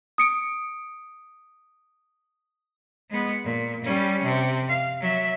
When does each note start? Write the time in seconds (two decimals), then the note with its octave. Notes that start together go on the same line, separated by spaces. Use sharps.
0.18 D#6 C#7 D7
3.10 G#3 B3
3.44 A#2
3.84 G3 C#4
4.24 C3
4.69 F5
5.01 F#3 E5